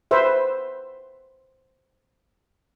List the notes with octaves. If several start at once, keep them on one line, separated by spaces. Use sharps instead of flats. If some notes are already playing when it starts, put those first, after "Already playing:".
B4 C5 E5